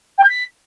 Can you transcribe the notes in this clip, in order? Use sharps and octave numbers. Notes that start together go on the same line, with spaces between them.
G5
G6
B6